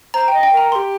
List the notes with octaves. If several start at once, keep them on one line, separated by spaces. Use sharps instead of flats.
C5 A#5
G5
D#5
G5
A#4 A#5
A#4 C6
G4